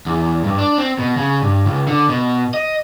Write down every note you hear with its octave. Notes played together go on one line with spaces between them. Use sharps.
E2
G2
D4
C4
B2
C#3
G2
C#2
D3
B2
D#5